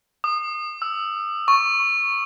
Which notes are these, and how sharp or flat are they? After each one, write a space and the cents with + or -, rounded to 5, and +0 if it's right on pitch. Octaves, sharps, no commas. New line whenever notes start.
D#6 -30
E6 +5
C#6 -5